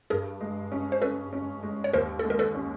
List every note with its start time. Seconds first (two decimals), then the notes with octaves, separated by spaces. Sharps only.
0.10 G2 G#4 A#4
0.41 G#3
0.72 C#4
0.92 C5
1.02 C#4 A4 B4
1.33 C#4
1.63 G#3
1.84 C#5
1.94 D#2 A#4 C5
2.19 A4
2.24 G#3
2.30 A#4
2.39 A4 B4
2.55 C#4